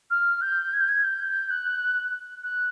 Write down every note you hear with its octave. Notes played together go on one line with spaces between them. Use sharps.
F6
G6
G#6
G6
G#6
G6
F#6
F#6